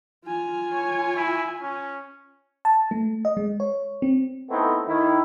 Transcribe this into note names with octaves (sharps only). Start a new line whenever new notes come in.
F4 G#5
C#5
E4
C#4
A5
A3
D#5
G#3
C#5
C4
A3 B3 C4 D#4 E4 A4
D#3 E4